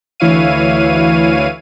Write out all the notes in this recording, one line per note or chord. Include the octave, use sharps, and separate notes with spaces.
D2 E3 E4 C#5 F5 D#7